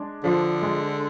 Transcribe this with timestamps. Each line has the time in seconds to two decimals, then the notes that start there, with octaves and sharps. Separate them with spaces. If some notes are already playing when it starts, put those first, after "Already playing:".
Already playing: G#3 D4
0.24 D3 F3
0.62 G#3